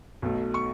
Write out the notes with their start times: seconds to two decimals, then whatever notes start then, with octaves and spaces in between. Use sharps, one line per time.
0.22 B1 B2 A3
0.54 C#6